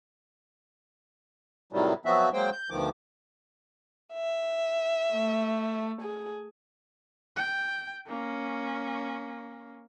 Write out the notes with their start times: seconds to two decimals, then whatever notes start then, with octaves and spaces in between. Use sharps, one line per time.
1.73 A2 C3 D#3 F#3 G3
2.05 F3 F#3 B3 C4 F#4 E5
2.33 F#3 G#3 A#3 C5 G5
2.52 G6
2.70 D2 B2 D#3 F3 D6
4.13 E5
5.13 A3
6.01 G#4
7.36 G5
8.07 A#3 C#4